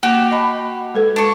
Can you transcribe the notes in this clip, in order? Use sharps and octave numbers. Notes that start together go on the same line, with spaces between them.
A#3 F#4 G4 F#5
D#5 A5 B5
G#3 A4 B4
D4 C#6